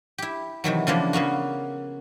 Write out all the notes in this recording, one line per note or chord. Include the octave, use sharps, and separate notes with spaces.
E4 G4
C3 D#3 E3 F#3
C#3 E3 F3 G#3 A#3 D4
C#3 A#3 B3 F#4